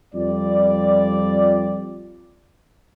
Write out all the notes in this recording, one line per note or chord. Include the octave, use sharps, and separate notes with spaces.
F2 G3 F4 D5